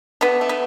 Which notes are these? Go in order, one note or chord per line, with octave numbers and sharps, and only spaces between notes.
A3 B3 D4
A3
B3